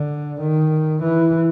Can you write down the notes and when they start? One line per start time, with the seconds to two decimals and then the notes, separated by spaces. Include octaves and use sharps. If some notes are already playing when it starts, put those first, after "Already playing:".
Already playing: D3
0.41 D#3
1.03 E3